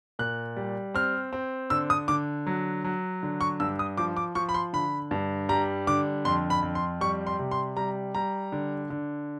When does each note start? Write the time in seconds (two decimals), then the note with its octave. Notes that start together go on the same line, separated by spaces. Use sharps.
0.19 A#2 F#6
0.56 G3
0.94 C4 F6
1.33 C4
1.70 D3 E6
1.90 D#6
2.08 D3 D6
2.46 F#3
2.84 F#3
3.23 D3
3.41 C#6
3.60 G2 E6
3.79 D#6
3.97 F3 D6
4.17 D6
4.35 F3 C#6
4.49 B5
4.54 C6
4.73 D3 B5
5.11 G2
5.49 G3 A#5
5.87 D3 D6
6.25 F2 C6
6.50 B5
6.63 F2
6.75 C6
7.01 G3 C#6
7.27 C6
7.39 C3
7.51 C6
7.76 G3 A#5
8.15 G3 A#5
8.52 D3
8.90 D3